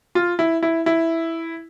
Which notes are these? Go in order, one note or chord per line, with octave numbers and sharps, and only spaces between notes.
F4
E4
E4
E4